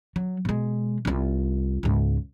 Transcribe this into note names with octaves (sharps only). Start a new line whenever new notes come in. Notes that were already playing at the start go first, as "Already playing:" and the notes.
F#3
B2 G#3
C2 F4
C#2 G#2